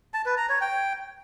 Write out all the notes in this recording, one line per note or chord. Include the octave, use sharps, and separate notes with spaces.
A5
B4
A#5
C#5
G5